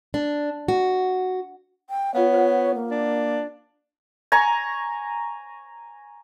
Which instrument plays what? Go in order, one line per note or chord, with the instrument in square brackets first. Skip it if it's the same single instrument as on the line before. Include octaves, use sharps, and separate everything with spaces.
[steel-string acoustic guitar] D4
F#4
[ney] G5
[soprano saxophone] B3 [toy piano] F4 F5 [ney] C#5
[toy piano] C5 F#5
[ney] A#3
[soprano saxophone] D4
[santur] G#5 A#5 C#6